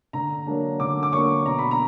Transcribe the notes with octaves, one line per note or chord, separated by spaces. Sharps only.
D3 A#5
F#3 A#3 D4
D3 D6
D6
F#3 A#3 D4 C#6
B2 A#5
B5
A#5